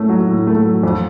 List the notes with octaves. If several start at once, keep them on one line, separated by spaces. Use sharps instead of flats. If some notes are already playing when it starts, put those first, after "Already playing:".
Already playing: A2 A3 C#4
F#3
A2
A3
F#3
F2